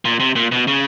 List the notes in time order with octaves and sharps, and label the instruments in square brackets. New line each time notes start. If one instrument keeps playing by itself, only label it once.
[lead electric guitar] A#2
C3
A#2
B2
C#3